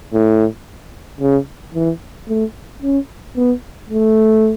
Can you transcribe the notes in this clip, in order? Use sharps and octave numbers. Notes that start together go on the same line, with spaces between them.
A2
C#3
E3
A3
C#4
B3
A3